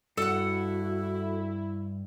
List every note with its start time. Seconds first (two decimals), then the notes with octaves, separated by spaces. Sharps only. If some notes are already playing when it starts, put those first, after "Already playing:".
0.17 G2 E4 F#4 A4 F#5